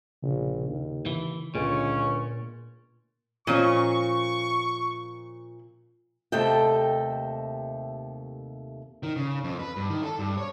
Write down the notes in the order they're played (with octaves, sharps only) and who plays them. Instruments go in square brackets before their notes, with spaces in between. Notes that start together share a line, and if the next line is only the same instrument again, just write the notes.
[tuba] A#1 [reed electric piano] C#3
[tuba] D#2
[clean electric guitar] E3
[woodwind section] C#2 C#4 [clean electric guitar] A#2 [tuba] D3
[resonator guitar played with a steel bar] A#2 [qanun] F3 C#4 D#5 [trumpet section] C#6
[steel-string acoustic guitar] D#2 C3 A3 A4 D#5 G5
[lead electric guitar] D#3
C#3
F2
B4
G2
D#3
A4
G2
C#5